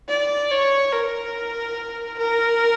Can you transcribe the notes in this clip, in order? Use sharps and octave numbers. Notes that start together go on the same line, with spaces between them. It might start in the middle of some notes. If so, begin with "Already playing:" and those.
D5
C#5
A#4
A#4